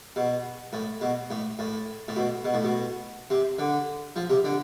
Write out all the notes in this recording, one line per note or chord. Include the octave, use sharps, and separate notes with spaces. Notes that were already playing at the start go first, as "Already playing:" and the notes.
B2
A2
B2
A2
A2
A2
B2
B2
A2
B2
C3
D3
F3
C3
D3